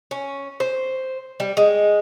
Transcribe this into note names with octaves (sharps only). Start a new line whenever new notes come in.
C#4
C5
G3
G#3